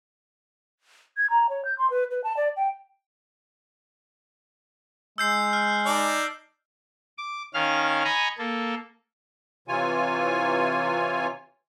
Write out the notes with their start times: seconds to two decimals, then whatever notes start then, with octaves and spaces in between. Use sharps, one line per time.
1.17 G#6
1.30 A#5
1.49 C#5
1.65 G6
1.78 C6
1.90 B4
2.11 B4
2.24 A5
2.37 D5
2.56 G5
5.18 G#3 E6 G6 C7
5.53 F6
5.86 D#4 D5 A5
7.18 D6
7.54 D#3 C#4 F5 F6
8.05 D#5 G#5 A#5 B5 C#6
8.38 A#3 A4
9.68 C3 E3 F4 C#5 G#5